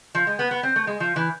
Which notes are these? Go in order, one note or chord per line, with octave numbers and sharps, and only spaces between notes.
F3
G#3
B3
B3
C4
A3
G#3
F3
E3